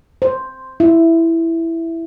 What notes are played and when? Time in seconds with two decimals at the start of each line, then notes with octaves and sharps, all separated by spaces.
0.22 C5
0.80 E4